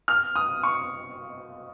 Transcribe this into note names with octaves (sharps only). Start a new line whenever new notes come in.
F6
D#6
C#6